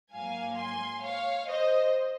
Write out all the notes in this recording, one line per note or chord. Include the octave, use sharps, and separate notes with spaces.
G#2 F#3 A#3 F5 G#5
G#5 C6
C#5 F5
C5 D#5